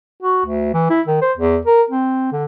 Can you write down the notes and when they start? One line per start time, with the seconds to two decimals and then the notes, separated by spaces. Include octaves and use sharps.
0.23 F#4
0.46 D2
0.73 E3
0.90 E4
1.07 D#3
1.22 C5
1.38 E2
1.66 A#4
1.90 C4
2.32 D3